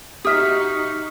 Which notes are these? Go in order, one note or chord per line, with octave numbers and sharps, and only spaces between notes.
D#4 F#4 G4 E5 D#6 F6 B6